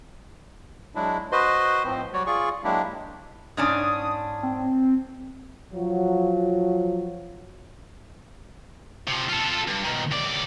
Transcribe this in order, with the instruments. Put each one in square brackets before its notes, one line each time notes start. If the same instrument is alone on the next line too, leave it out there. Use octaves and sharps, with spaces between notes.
[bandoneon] F#3 G#3 D4 E4
F#4 B4 C5 D#5 C6
A2 F3 C4
F#3 G3 F#4 C#5 D5
F4 G#4 D5 C#6
F#3 G#3 A#3 D4 E4 G4
[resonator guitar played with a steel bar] G#2 C#4 D4 [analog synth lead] D#6
[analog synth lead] C4
[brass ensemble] F3 F#3
[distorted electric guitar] C3 F3
F4 A4
G2
B2 D#3
C#2 D5